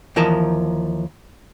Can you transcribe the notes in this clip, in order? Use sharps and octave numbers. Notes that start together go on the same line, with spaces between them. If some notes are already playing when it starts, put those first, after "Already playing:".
D#2 E3 F3 A#4 D#5 A5